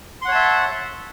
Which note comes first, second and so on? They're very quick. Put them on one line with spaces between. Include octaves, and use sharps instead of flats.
C6 F#5 C#5 A5 E5